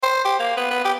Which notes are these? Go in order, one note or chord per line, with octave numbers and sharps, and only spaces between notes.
C5
G4
A#3
B3
B3
G4